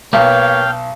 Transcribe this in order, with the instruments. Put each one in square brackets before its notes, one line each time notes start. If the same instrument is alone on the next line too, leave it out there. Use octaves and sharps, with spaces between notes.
[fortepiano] B1 [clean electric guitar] A#3 B3 G4 [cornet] C#5 [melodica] F5 G5